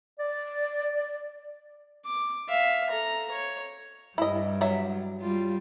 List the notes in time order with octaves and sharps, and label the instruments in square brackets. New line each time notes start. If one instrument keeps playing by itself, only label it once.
[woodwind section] D5
[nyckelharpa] D6
E5 F5
A4 A#5
C#5
[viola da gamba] G2 G3 [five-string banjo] E4 D#5
[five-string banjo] F#3 E5
[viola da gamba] G3 F4